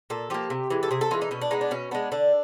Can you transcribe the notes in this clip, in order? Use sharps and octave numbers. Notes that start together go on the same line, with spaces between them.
A#2 A4
F3 A#3 G4
C3
E3 G#3
A4
C3 G#4
A4
E3 G#3 F4
D#4
B2 C#4
D4
G#3 B3 D#4
D4
B2 C#4
G#3 B3 D4
D3 D4